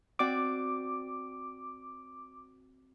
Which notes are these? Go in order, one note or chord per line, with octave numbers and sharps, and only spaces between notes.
C4 F#4 D5 D6